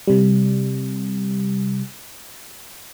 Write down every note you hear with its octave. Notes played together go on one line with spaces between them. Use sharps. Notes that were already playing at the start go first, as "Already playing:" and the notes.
C3 G3